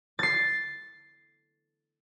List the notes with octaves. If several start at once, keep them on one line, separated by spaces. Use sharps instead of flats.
A6 C7